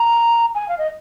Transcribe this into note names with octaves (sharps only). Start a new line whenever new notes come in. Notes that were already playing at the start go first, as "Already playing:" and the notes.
Already playing: A#5
G#5
F5
D#5